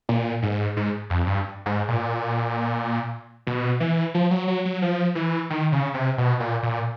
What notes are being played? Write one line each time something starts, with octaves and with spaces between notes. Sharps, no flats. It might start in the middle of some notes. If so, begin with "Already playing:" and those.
A#2
G#2
G#2
F2
G2
G#2
A#2
B2
E3
F3
F#3
F#3
F#3
F3
E3
D#3
C#3
C3
B2
A#2
A#2